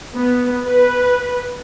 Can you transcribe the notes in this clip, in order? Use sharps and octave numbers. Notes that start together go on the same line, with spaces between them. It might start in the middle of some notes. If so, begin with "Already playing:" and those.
B3
B4